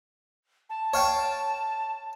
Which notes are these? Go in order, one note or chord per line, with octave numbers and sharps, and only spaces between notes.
A5
C#5 F5 G5